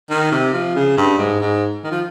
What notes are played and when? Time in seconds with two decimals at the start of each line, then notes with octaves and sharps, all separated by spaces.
0.10 D#3
0.31 C3
0.53 F3
0.76 C#3
0.97 G2
1.18 G#2
1.41 G#2
1.84 D#3
1.91 F3